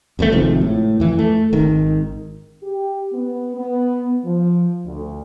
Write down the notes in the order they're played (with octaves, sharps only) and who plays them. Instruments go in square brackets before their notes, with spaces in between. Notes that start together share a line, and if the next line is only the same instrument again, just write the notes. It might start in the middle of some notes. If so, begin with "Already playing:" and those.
[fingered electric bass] G1 E2 C#3 A3
G#1 G#2 C3 F3
A2
F2 E3
A3
G#1 D#3
[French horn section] G4
B3
B3
F3
D2